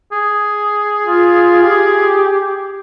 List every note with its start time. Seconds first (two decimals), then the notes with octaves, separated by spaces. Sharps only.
0.12 G#4
1.05 F4
1.63 G4